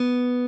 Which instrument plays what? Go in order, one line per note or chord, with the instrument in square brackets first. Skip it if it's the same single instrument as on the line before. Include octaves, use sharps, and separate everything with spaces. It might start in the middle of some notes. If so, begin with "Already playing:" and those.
Already playing: [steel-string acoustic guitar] B3